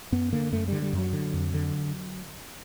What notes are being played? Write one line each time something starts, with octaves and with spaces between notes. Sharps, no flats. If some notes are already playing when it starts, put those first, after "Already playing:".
F#2 B3
D3 A#3
F#2 A3
D3 G3
G3
F#2 F#3
D3
F2
D3